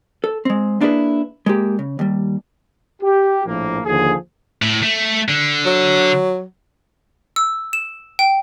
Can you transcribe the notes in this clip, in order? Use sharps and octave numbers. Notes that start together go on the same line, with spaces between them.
A4
G#3 C4
A#3 D4 E4 F4 G#4 B4
G#3 A#3 G4
C#3
D#2 G3
G4
A#1 A2 F3 A#3
D#2 D3 F3 G#4
A2
A3
D3
F#3
E6
E7
G5